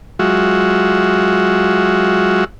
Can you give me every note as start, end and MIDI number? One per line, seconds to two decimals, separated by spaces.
0.19 2.44 54
0.19 2.44 56
0.19 2.44 65
0.19 2.44 66
0.19 2.44 76